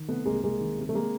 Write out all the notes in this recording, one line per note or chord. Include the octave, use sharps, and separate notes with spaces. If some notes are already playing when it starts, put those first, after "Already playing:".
Already playing: D#3
C3 A3 B3
C2 G#3 A#3
C2 G#3 A#3
D#3
C3
A3
G#3 A#3